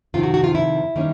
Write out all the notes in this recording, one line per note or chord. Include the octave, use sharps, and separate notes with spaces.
F2 C3 D#3 F4
F#4
F#4
F4
E4
D#3 G3 A#3 C#4